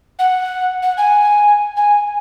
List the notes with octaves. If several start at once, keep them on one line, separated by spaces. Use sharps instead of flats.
F#5
F#5
G#5
G#5